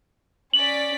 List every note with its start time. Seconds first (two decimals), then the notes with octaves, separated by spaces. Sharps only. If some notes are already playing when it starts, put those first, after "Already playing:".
0.54 C#4 D5 B6 F#7